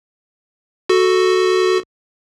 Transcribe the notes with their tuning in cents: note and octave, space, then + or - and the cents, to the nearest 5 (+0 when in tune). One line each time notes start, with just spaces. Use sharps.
F#4 +0 A4 +0